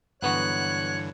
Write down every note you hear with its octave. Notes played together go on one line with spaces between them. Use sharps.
G2 D3 E3 F#3 B3 F#4 C#5 F#6